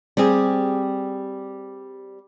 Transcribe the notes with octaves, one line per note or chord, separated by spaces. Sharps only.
G3 C4 G4 G#4